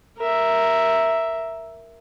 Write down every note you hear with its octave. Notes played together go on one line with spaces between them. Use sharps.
A#4 E5